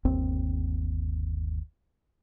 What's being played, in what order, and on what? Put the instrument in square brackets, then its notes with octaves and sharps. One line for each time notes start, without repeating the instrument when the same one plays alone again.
[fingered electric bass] G1 D#2 C4